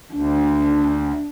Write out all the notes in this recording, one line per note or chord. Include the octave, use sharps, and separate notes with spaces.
D2 D4